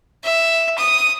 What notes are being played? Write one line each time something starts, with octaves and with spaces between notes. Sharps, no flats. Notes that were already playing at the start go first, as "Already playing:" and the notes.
E5
D#6